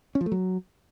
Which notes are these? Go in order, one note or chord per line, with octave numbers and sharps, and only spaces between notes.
C#4
F3
A3
F#3